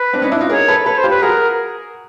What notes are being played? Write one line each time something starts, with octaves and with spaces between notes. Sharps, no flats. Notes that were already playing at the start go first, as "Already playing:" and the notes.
Already playing: B4
C4 D4
C#4 D#4
D4 E4
D#4 F4
G#4 A#4 C#5
A4 B4
A4 B4 C#5
C5
F4 G4
B4
F#4 G#4 A#4